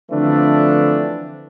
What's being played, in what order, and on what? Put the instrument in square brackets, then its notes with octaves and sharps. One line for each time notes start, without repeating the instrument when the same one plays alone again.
[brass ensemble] D3 E3 F3 A3 C4 D4